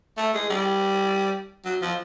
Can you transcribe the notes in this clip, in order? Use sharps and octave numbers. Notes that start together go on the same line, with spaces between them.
A3
G#3
G3
F#3
F3